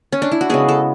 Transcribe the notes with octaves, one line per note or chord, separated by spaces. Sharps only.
C#4
D4
E4
F#4
C#3 G#3 B3 G#4
A4